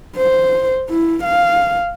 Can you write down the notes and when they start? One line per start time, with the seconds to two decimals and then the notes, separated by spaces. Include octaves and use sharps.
0.17 C5
0.89 E4
1.24 F5